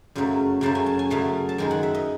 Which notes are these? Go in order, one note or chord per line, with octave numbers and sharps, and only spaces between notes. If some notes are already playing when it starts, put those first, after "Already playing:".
F#2 C#3 F#3 A3
F#2 C#3 F#3 A3 A5
G#5
A5
G#5
F#2 C#3 F#3 A3 A5
A5
F#2 D#3 G#3 G#5
F#5
E5
D#5